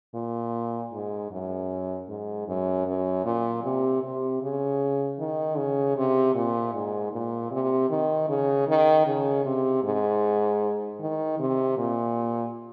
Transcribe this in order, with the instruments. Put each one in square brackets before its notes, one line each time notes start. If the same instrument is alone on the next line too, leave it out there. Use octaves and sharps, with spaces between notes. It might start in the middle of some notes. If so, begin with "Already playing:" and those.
[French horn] A#2
G#2
F#2
G#2
F#2
F#2
A#2
C3
C3
C#3
D#3
C#3
C3
A#2
G#2
A#2
C3
D#3
C#3
D#3
C#3
C3
G#2
D#3
C3
A#2